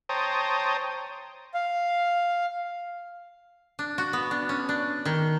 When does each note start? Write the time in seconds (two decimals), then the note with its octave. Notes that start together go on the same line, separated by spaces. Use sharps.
0.09 C5 C#5 G5 A5 A#5 D#6
1.54 F5
3.79 D4
3.98 F#4
4.13 B3
4.31 D4
4.49 C#4
4.69 D4
5.05 D#3